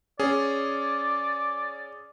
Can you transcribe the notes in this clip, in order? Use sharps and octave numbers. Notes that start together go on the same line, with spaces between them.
C#4 G#4 D5